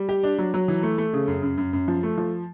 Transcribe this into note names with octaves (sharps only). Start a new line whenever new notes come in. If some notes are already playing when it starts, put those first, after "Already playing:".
Already playing: G3
G4
D4
F#3
F#3
E3
A3
A3
C#3
F#2
F#2
F#2
F#2
F3
A3
F3